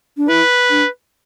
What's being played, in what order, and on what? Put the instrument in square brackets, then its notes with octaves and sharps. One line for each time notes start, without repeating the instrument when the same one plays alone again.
[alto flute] D4
[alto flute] E4 [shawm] B4
[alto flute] D4